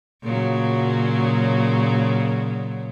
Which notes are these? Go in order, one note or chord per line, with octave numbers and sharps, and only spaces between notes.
A#2 C#3 F#3